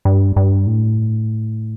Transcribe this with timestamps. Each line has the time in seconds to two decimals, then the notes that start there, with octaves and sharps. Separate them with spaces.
0.05 G2
0.36 G2
0.67 A2